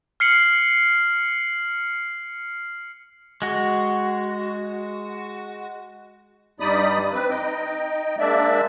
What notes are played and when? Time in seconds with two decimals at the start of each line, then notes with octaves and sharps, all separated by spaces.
0.20 F6 C7 C#7 F#7
3.42 G#3 F#4
6.60 G2 G3 D#4 D5 B5 D#6
7.12 C4 B4
7.30 D#4 D#5 G5
8.18 G#3 A#3 D4 D5 E5